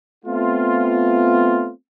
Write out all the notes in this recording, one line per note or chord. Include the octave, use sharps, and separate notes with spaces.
A3 B3 C4 F4